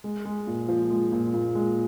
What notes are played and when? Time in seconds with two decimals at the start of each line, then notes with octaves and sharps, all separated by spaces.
0.04 G#3
0.25 G#3
0.47 A#2
0.68 F3
0.90 G#3
1.12 A#2
1.34 A#2
1.55 G#3